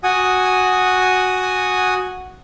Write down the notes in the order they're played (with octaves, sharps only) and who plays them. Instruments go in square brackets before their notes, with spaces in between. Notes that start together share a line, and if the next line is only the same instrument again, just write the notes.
[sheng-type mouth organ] F#4 F#5 G#5 D#6